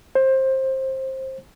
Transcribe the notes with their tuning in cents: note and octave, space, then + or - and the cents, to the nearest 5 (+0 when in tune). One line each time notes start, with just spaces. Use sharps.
C5 +20